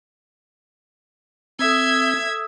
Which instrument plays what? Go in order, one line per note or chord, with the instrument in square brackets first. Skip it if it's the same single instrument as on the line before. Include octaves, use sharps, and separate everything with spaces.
[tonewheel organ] C4 [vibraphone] A4 D#6 E6 [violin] E5 G#6